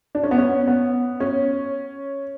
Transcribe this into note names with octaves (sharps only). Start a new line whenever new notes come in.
D4
C#4
B3
C#4
B3
C#4